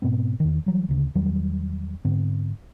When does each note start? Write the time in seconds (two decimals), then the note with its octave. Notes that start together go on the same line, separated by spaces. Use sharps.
0.02 G#2 B2 B3 C4
0.40 E2 D#3
0.66 E3 F#3 G3
0.89 D2 C#3
1.15 E2 D#3 F#3 G3
2.05 G#2 D3 B3 C4